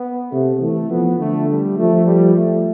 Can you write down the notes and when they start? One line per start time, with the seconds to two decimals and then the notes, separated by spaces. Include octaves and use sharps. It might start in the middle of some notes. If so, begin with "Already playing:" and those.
Already playing: B3
0.32 C3 A3
0.61 E3 A3
0.90 F3 B3
1.19 D3 A3
1.48 G3
1.77 F3 A3
2.06 G3
2.36 A3